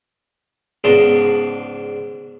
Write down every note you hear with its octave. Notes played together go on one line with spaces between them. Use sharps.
C#2 G#2 B3 D4 C6